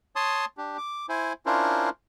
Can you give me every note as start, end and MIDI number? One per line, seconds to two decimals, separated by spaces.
0.16 0.45 73
0.16 0.45 81
0.16 0.45 84
0.16 0.45 87
0.57 0.77 62
0.57 0.77 67
0.78 1.06 86
1.09 1.33 64
1.09 1.33 72
1.09 1.33 80
1.46 1.89 61
1.46 1.89 62
1.46 1.89 64
1.46 1.89 65
1.46 1.89 70
1.46 1.89 72